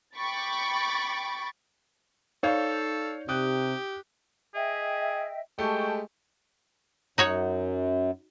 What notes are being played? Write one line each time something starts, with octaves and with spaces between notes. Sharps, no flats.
G5 B5 C#6 D6 A6
D#4 A4 C#5 D5 F5 G6
C3 G4 D#6 F#6
G#4 D#5 E5 G5
G#3 A3 G4 G5 A5 C#6
F#2 D#4 F#4 C#5